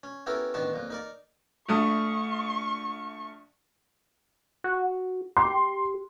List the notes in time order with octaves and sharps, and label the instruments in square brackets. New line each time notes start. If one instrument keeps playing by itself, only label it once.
[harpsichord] C#4
B3 C#4 E4 G4 A4 A#4
A1 D#3 B3 D4 A5 C#6
F2 A#2
D#4 A#4 D5
[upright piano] A#1 A3 D#6 [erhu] C#6
[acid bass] F#4
[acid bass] G4 [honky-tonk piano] C6